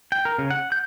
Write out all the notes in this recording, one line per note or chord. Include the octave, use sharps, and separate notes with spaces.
G5
A#4
C#3
F#5
G6